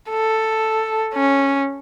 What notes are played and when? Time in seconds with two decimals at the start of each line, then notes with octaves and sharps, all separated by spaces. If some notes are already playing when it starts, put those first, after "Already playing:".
0.11 A4
1.14 C#4